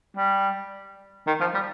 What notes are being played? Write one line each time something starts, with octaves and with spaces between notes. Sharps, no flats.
G3
D#3
F3
G3